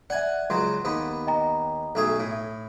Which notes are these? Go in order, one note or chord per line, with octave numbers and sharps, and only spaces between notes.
D5 E5 F#5 G#5
C#2 F#3 C6
D#2 B3
D#5 G5 A#5
B1 A3 G#4
A2